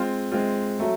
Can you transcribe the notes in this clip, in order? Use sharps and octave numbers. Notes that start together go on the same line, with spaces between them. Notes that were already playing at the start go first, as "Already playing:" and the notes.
Already playing: G#3 C4 F4
G#3 C4 F4
F#3 A3